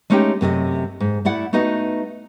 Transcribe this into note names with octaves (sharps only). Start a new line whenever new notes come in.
G#3 A3 C#4 D#4 G4 G5
F#2 C3 A3 D#5
G#2
A3 E4 D5 F#5
A3 B3 D#4 F#4 D#5